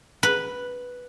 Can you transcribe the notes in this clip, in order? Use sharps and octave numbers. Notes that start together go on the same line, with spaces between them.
B4